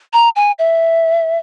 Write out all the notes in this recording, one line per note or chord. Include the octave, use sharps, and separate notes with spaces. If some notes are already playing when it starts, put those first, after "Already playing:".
A#5
G#5
E5